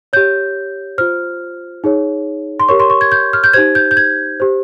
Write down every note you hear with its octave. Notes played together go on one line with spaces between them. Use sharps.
G4 C#5 G6
F4 C5 F6
D#4 G#4 C#5
C6
G4 A#4 C#5 C#6
C6
C#6
G#6
G6
F6
G6
D#4 G4 C5 G#6
G6
G6
G#6
G4 C5